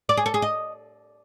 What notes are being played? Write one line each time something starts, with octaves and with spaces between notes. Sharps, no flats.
D5
G#4
A4
G#4
D#5